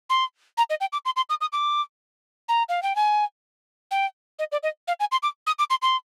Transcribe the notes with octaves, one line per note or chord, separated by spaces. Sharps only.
C6
A#5
D#5
G5
D6
C6
C6
D#6
D#6
D6
A#5
F5
G5
G#5
G5
D#5
D5
D#5
F5
G#5
C6
D6
D#6
D6
C6
C6